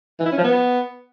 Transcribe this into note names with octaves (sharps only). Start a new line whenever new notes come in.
E3
E4
C#4
F3
B3